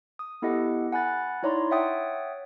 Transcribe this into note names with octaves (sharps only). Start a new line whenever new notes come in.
D#6
B3 E4 G4 A4 D#5 F#5
F#5 G#5 B5 F#6 A6
D#4 E4 C#5 D5 A#5 C6
C#5 E5 F#5 G5 D#6 A6